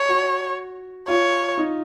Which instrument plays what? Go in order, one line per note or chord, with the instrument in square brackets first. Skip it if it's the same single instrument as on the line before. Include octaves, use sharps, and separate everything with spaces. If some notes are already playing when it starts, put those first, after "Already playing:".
Already playing: [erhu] C#5
[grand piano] F#4
[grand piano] F4 [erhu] C#5
[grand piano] D#4